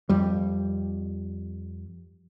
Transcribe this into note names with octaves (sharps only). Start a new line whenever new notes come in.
F2 G3